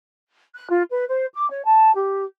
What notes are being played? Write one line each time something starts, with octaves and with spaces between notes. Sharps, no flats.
F#6
F4
B4
C5
D6
C#5
A5
G4